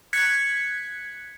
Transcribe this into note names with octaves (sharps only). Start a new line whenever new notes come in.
F#6 G#6 B6 C#7